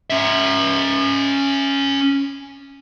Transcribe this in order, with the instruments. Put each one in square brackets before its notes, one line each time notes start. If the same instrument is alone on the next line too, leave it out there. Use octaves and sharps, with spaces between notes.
[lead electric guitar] C#4 E5